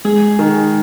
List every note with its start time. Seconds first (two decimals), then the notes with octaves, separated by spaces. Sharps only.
0.05 G#3 G#4
0.39 D#3